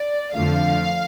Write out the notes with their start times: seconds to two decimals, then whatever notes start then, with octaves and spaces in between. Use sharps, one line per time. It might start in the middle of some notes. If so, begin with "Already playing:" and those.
Already playing: D5
0.34 F2 D3 F3 A3 F5